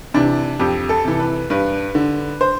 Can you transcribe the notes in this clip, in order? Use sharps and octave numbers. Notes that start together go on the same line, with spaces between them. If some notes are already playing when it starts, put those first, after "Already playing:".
C3 E3 D4
F2 G4
A4
C3 E3
B4
G2 B4
D3
C5